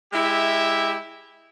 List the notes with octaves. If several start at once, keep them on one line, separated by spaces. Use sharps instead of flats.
G#3 E4 G4 E5